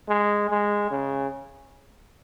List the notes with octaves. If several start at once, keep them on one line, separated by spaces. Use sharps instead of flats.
G#3
G#3
C#3